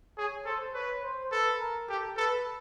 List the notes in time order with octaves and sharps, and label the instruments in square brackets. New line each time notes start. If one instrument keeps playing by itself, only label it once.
[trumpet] G#4 [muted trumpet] C#5
[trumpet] A4 [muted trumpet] C5
[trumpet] B4 [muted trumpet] C#5
[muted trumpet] C5
[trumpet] A4 [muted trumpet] B4
[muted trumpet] A#4
[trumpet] G4 [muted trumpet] A4
[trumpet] A4 [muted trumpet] B4